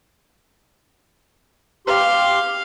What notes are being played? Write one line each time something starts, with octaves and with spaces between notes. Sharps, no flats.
G4 F5 C6